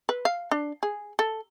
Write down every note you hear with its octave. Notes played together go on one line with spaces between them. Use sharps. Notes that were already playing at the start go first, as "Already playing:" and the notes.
B4
F5
D4
G#4
A4